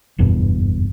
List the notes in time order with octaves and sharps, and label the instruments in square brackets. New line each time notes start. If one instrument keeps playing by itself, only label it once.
[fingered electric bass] F#1 E2 G2 B2